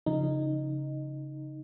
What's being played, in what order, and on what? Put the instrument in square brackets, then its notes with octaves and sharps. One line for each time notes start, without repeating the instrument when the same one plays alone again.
[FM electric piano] C#3 F3 D#4